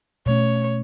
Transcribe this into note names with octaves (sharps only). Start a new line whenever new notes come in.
B2 A3 C#4 C#5